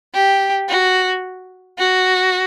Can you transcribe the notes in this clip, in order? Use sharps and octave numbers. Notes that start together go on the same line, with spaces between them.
G4
F#4
F#4